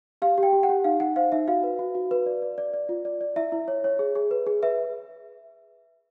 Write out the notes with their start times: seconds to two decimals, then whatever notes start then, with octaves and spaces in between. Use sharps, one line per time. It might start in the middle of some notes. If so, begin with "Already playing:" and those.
0.22 G4 F5
0.38 G4
0.43 G5
0.53 G4
0.63 F#5
0.69 G4
0.84 D#4 F5
1.00 D#4 F#5
1.16 C5 F5
1.32 D#4 E5
1.48 F#4 F5
1.64 B4
1.79 F#4
1.95 F#4
2.11 B4
2.26 D5
2.42 D5
2.58 D5
2.74 D5
2.89 F4
3.05 D5
3.21 D5
3.36 E4 E5
3.52 E4
3.68 C#5
3.84 C#5
3.99 G#4
4.15 G#4
4.31 B4
4.47 G#4
4.63 B4 E5